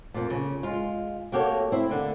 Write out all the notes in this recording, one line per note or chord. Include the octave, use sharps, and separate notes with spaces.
F2 A#2
C#3
G#3 F4
A#3 F#4 G4 A4 C#5
C4 E4
D3 A#3